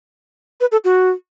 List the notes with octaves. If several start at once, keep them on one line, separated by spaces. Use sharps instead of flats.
B4
A4
F#4